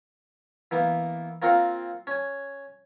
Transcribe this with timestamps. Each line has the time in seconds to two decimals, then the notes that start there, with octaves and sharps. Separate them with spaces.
0.71 E3 A#3 B3
1.42 A#3 C4 F4 A#4 F5 F#5
2.07 C#4 G#5